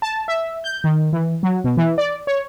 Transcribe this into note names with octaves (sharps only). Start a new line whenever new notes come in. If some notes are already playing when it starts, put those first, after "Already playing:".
A5
E5
G6
D#3
E3
F#3
B2
E3
D5
C#5